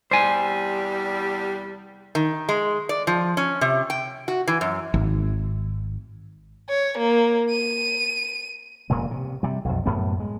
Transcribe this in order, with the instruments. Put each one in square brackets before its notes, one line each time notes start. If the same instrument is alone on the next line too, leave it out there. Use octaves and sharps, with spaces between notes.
[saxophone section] E2 C3 G3 [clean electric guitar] C5 G#5
[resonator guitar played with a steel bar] D#3
G#3
D5
F3
C#4
C3
G5
F#4
E3
F#2
[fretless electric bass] G#1
[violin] C#5
A#3
D#7
[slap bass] F1 A#2 C#3 G#3
C3
C3 G3
B1 F2
F#2 A2 A3 B3
G#3